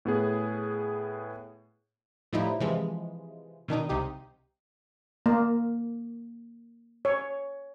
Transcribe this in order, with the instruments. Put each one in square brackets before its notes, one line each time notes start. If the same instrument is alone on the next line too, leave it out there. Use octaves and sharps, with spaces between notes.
[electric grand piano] A2 B3 G#4
[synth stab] A2 F3 G3 D#4 E4
C3 E3 F3 G#3
B2 D#3 D4 D#4
C2 C3 D#4 G4
[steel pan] A#3
C#5